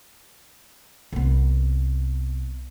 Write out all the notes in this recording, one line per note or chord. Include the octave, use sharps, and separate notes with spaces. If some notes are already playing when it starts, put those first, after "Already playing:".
C2 B3